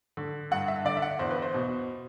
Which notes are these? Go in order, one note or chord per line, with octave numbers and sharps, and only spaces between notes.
D3
G2 F#5
E5
D3 D5
E5
F#5
E2 C5
B4
C5
B2